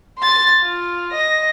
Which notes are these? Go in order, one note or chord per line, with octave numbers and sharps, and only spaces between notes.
C6 A6
F4
D#5 A#6